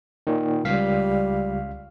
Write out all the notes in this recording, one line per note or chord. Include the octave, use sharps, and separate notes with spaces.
A#2 D#3
C#2 G3 F5 B6